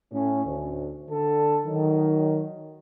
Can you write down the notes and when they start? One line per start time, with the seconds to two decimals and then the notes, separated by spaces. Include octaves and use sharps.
0.11 A2 C#4
0.45 D2
1.10 D3 A4
1.66 D#3 F#3